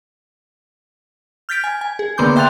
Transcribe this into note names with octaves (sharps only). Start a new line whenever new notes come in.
F6 G6 A6 B6 D7
G#5
G#5
G#4
D3 A#3 B3 C6 D6 G6
E5 G5 C6 F#6 A6 F7